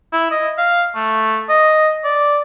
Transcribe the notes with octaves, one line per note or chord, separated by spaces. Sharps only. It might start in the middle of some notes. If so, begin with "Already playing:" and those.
E4
D#5
F5
A3
D#5
D5